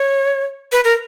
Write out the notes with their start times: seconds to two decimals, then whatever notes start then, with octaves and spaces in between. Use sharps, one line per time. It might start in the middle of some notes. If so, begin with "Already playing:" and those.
Already playing: C#5
0.72 B4
0.84 A#4